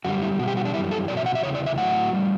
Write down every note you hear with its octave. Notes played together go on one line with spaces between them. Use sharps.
F#2 D3 G3 F#4
E4
B2 G3 F#4
G4
F#4
D4
F#2 E3 G3 E4
A4
B2 F#3 D5
E5
F#5
E5
E2 C#3 E3 C#5
D5
E5
A2 F#3 F#5
A2 G3